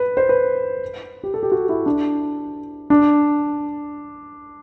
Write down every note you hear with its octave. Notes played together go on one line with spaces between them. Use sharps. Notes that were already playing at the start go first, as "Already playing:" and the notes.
Already playing: B4
C5
B4
G4
A4
G4
F#4
E4
D4
D4